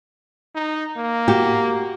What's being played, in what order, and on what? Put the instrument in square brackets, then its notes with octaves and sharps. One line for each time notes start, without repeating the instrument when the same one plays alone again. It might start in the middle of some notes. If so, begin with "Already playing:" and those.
[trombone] D#4
A#3
[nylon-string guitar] F#4 G4